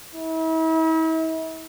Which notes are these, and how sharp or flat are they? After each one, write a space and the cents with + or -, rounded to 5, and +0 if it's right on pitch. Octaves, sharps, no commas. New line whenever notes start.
E4 -40